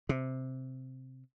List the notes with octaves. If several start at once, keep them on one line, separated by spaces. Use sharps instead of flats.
C3